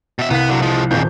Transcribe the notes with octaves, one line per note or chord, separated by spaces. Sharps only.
B2 E5
C2 B3 F5 B6
D3 F#3
F3 G#3
D#1 G#1 F2 C#3 G6